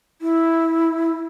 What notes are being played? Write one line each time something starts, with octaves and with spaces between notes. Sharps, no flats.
E4